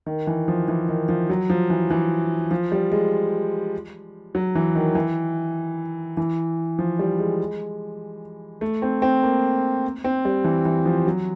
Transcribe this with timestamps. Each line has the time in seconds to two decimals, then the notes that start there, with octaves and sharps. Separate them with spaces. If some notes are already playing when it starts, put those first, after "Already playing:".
0.06 D#3
0.27 E3
0.48 F3
0.68 E3
0.89 D#3
1.09 F3
1.30 F#3
1.50 F3
1.70 E3
1.90 E3
2.51 F3
2.72 G3
2.92 G#3
4.35 F#3
4.55 E3
4.75 D#3
4.95 E3
6.17 E3
6.79 F3
6.99 G3
7.19 G#3
8.61 A3
8.82 C4
9.02 C4
9.23 A#3
10.04 C4
10.25 G3
10.44 E3
10.65 E3
10.85 F3
11.07 F#3